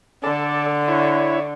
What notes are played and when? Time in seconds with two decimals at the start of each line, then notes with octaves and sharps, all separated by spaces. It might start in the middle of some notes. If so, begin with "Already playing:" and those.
0.23 D3 A4 D5
0.88 E4 C#5